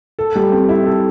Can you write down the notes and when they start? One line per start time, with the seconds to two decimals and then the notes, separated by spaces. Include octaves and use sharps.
0.19 A4
0.36 G3
0.52 C4
0.69 E4
0.86 A4